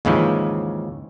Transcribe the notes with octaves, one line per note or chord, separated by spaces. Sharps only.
D#2 G#2 C#3 E3 F3